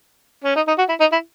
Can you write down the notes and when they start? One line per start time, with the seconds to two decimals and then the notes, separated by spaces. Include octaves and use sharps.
0.44 C#4
0.56 D#4
0.68 D#4
0.78 F#4
0.89 E4
1.00 D#4
1.12 E4